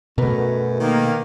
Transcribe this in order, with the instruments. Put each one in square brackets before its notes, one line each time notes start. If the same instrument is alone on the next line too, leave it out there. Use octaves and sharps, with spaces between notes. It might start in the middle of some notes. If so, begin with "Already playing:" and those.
[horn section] F#2 [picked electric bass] B2 A3 [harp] A#4 B4
[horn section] D#3 A#3